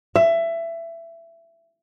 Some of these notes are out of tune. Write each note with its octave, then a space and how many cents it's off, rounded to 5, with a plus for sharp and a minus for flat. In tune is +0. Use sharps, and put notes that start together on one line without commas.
E5 +20